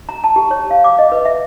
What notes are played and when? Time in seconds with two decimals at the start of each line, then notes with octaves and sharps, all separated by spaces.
0.09 A#5
0.24 A5
0.36 G4
0.51 C#5
0.70 F5
0.84 D6
0.99 D#5
1.12 B4
1.25 E5